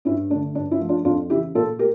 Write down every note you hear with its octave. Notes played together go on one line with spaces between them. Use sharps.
G2 C#4 E4
D3 A3 D4
G2 D4
C#4 E4
F3 A3
D4 F4
F2 D4 F4
C#3 E3 E4 G4
A#2 F4 A4
A3 G4 A#4